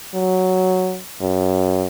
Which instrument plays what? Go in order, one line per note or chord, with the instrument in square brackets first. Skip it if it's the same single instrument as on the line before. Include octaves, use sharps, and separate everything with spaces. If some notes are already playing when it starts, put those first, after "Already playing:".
[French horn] F#3
F#2